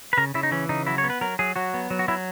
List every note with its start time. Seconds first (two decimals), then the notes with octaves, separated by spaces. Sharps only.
0.13 B4
0.17 C#3 A#4
0.34 C#3 E4
0.43 D#4
0.51 E3 C#4
0.69 C#3 D#4
0.87 F#3 E4
0.98 C#5
1.04 B3
1.10 B4
1.21 F#3 A#4
1.39 F#3 G#4
1.56 F#3 F#4
1.74 B3
1.90 F#3
1.99 F#4
2.08 F#3 E4